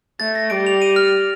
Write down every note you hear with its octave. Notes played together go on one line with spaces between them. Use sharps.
A3 A6
A#6
G3 D7
F7
D#7
F6